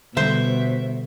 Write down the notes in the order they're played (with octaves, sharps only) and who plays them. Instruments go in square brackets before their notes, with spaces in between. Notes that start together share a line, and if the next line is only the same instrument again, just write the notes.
[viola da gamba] B2 [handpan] D3 G3 [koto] C5 [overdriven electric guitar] E5